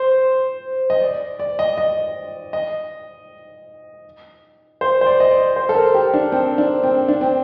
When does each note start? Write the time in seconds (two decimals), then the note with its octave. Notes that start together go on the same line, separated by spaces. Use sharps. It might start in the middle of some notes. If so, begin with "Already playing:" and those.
Already playing: C5
0.90 D#5
1.02 D5
1.39 D5
1.59 D#5
1.78 D#5
2.53 D#5
4.81 C5
5.01 C5
5.06 D5
5.20 D#5
5.31 D5
5.56 C5
5.69 A4
5.75 A#4
5.94 G4
6.14 D4
6.32 C4
6.58 D4
6.83 C4
7.08 D4
7.21 C4